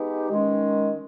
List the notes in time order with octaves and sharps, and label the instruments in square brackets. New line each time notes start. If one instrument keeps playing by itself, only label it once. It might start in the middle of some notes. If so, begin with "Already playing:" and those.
Already playing: [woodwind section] G#3 B3 D#4 G4
D#3 G#3 C#4